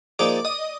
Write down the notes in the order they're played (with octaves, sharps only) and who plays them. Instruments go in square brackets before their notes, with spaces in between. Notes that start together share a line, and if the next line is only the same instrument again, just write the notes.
[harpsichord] F3 A#3 D#4 G#4 [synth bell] D5 D6
[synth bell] D#5 D#6